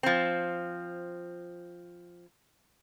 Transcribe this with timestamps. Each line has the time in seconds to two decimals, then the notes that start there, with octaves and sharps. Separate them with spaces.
0.03 F3 C4